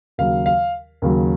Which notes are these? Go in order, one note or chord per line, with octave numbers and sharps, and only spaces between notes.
D#2 C#3 F#3 F5
F5
D#2 C#3 F#3